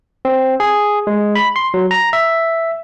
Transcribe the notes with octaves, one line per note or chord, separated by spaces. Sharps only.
C4
G#4
G#3
B5
C6
F#3
A#5
E5